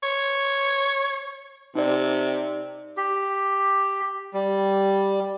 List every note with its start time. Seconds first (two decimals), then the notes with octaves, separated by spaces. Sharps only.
0.03 C#5
1.75 C3 D#4 D5
2.97 G4
4.33 G3